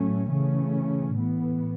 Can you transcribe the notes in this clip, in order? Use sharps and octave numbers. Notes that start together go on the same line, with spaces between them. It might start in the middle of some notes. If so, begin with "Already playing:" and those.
Already playing: A2 F#3 A3 C#4
C#3 E3 A3 C#4
A2 E3 B3